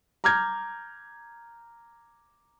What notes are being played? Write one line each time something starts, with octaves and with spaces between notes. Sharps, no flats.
A#5 D6 F6 G6 G#6